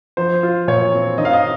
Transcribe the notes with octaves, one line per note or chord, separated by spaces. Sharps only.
F3 C5
F4
A#2 C#5
C4
D#3 D#5
F5
D#5